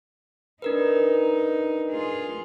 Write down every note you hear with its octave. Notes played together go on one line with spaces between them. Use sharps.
D4 D#4 A#4 B4
F4 G#4